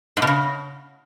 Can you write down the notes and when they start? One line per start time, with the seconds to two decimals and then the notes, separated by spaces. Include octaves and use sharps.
0.17 G#2
0.22 B2
0.27 C#3